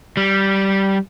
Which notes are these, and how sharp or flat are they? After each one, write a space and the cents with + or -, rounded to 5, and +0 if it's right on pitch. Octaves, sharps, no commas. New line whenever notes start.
G3 -10